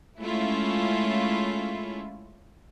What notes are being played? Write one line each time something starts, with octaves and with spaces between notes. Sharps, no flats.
G#3 A3 C#4 E4 F4